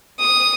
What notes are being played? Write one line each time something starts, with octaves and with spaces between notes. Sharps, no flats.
D#6